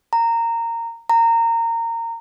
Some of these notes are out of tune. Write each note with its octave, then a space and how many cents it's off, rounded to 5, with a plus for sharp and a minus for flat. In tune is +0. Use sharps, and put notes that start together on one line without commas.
A#5 -15
A#5 -20